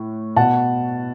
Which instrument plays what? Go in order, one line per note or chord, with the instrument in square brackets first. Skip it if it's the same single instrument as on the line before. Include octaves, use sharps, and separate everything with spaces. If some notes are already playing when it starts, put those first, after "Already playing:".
Already playing: [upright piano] A2
B2 F#5 A5